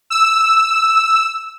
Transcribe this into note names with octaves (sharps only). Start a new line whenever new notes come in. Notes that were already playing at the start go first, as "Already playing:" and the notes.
E6